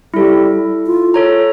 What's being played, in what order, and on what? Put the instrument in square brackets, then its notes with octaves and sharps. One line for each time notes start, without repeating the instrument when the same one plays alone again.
[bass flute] G3 [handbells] E4 A4
[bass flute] F4
[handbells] A4 C#5 A#5